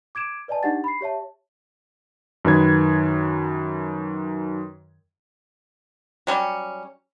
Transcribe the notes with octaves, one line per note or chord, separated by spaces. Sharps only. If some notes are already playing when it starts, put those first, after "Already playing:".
D6 G#6 D7 E7
B4 D5 D#5 G#5 A5
D4 D#4 G4 F#5 A6
B5 C7
G4 C#5 E5 A5
F#2 D#3 B4 G#6
F#3 G3 C#4